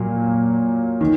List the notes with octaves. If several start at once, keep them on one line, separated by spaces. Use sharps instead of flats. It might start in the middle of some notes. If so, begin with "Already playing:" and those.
Already playing: A#2 F#3 A#3
D#3